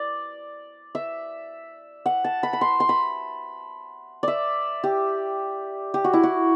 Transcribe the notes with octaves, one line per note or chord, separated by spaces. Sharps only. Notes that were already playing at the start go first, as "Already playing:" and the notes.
Already playing: D5
E5
F#5
A5
B5
B5
C6
C6
B5
D5 E5
G4
G4
F#4
E4
F#4